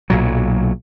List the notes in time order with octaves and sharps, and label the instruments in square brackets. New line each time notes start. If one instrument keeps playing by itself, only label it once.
[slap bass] B1 A#2 F#3